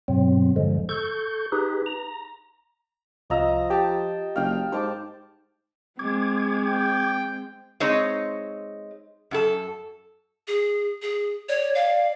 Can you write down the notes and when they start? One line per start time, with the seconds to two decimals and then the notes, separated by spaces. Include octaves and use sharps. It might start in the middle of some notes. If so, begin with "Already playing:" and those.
0.08 G2 B2 F#3 C4
0.56 G2 D3 F3 G#3
0.89 A4 C#6 G6
1.52 D#4 G4 G#4 B4
1.86 A#5
3.30 C2 F3 D#5 F5 A#5 E6
3.70 G4 G5 A5
4.36 F#1 F5 G5
4.72 G#2 C5 A5 D6
5.99 G#3 C4 D6 G#6
6.64 G5
7.80 G#3 C4 D#4 C#5
9.31 F#2 F#4 A4
10.48 G#4
11.02 G#4
11.49 C#5 D5
11.75 F5